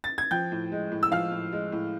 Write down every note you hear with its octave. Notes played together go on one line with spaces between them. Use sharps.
A6
G#6
F3 G5 G6
A2
G#3
A2
E6
F3 F5 F6
A2
G#3
A2